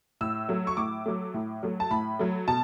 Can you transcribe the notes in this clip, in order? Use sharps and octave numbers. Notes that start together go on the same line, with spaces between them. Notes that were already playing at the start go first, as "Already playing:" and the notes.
A2 E6
F#3 A3
C#6
A2 D6
F#3 A3
A2
F#3 A3
A5
A2 B5
F#3 A3
B2 A5